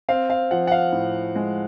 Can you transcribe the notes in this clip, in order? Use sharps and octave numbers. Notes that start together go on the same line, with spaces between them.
C4 F5
F5
F3 F#5
F#5
F5
A2
G#3